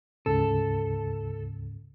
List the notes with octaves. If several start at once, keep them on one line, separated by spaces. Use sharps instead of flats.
D2 G#2 C#3 A4